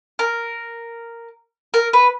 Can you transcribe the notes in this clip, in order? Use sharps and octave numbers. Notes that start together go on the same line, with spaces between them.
A#4
A#4
B4